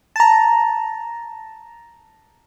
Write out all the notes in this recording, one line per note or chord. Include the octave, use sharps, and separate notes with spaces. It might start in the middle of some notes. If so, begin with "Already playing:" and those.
A5 A#5